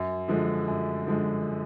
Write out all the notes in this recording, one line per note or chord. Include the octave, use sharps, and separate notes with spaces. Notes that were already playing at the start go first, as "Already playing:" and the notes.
Already playing: F#2
D3 F3 G#3
F#2
D3 F3 G#3